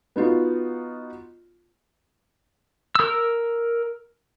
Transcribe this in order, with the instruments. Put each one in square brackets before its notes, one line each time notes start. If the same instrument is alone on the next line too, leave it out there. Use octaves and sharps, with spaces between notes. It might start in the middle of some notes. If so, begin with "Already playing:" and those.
[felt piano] B3 D#4 F4 F#4
[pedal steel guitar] A#4 E6